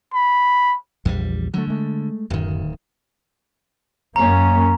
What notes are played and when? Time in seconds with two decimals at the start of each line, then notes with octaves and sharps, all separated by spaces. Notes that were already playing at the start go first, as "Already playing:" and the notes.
0.13 B5
1.05 A#1 E2 G3
1.54 D3 F#3 A3
1.67 G#3 A3
2.30 D1 F#2 D#3
4.16 F#2 A#3 C#4 A#5